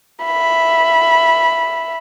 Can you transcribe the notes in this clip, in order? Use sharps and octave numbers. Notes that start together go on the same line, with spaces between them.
E5 B5